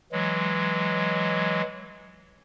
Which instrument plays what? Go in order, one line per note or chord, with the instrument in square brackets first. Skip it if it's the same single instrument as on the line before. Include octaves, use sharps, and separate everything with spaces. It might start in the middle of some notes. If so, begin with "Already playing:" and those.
[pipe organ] E3 F#3 G#3